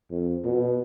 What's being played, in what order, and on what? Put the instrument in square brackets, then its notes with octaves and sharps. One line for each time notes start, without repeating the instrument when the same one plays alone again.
[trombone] F2
B2